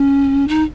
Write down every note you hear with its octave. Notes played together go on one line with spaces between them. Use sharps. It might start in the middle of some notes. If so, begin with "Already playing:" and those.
Already playing: C#4
D#4